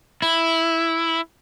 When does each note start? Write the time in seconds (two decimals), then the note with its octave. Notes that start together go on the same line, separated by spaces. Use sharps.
0.22 E4